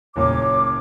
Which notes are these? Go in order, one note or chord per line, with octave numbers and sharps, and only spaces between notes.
F#1 A#2 C#5 D6